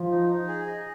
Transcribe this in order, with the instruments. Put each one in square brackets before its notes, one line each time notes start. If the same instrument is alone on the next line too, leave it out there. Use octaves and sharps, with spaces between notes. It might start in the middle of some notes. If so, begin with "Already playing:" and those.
Already playing: [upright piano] F3
[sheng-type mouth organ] D#4
D#4
G#4
D#5